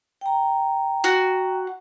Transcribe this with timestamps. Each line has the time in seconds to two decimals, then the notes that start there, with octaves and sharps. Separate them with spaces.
0.21 G5 A#5
1.04 F#4